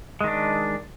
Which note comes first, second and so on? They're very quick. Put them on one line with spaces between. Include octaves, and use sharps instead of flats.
G#3 D#3 D4